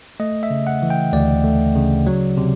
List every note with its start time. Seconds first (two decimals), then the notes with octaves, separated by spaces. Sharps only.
0.20 A3 D#5
0.43 E5
0.51 C#3
0.67 F#5
0.82 E3
0.90 G5
1.13 D2 D5
1.44 A3
1.75 C#3
2.06 F#3
2.37 C3